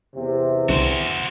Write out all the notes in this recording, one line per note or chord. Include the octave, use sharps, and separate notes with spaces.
E2 C3
C2 F#4 C5